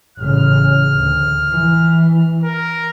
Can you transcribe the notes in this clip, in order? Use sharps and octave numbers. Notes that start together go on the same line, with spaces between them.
A1 C#3 F6
D2
E3
A#4